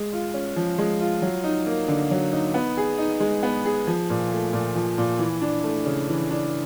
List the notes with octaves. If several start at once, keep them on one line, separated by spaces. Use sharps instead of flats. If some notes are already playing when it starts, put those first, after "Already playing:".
Already playing: G#3
F4
C#4
F3
G#3
F4
F#3
D#4
A#3
D3
F#3
D#4
B3
G#4
D#4
G#3
B3
G#4
F3
A#2
A3
A#2
F3
A#2
E3
D4
A3
C#3
E3
D4